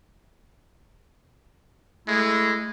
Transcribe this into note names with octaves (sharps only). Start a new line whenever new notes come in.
G#3 A3 E4